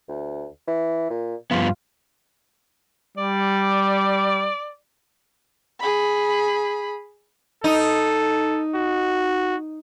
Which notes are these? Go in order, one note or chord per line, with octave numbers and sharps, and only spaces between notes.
D2
E3
A#2
G2 F3 B3 F4
G3 D5
G#4 B5
D#4 A4
F#4